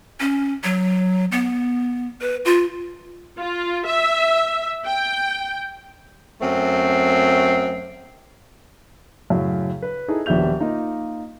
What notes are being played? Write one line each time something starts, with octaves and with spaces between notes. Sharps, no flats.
C#4
F#3
B3
B4
F4
F4
E5
G5
F#2 A3 C4
F#2 A2 C#3
B4
D#4 E4 G#4 A4
D#1 A#1 B2 E5 G6 F7
A#3 D#4 F4 D#5